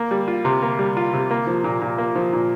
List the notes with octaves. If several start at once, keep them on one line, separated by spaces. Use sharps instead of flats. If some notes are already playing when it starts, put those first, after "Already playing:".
Already playing: A#3
G3
F4
C3
A#3
G3
F4
C3
A#3
F3
A#2
A#2
A#3
F3
A#2